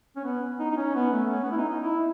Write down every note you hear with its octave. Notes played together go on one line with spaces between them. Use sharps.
C#4
B3
D#4
D#4
C#4
B3
A3
C#4
B3
E4
D#4
D#4
E4